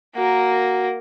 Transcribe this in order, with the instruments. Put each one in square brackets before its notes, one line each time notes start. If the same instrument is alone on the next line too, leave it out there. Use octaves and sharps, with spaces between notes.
[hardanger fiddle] A#3 A#4 [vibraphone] F#4 F#5